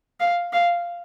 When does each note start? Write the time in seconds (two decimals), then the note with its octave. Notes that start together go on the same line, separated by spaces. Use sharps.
0.20 F5
0.53 F5